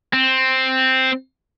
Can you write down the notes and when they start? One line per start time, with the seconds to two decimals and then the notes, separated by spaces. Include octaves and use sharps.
0.13 C4